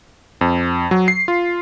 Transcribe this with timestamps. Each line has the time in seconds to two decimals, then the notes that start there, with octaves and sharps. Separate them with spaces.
0.41 F2
0.91 F#3
1.08 C7
1.28 F4